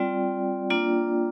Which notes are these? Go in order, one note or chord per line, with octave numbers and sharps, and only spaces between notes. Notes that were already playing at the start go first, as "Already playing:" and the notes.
Already playing: G3 C4 F4 D5 G5
A#3 D4 F4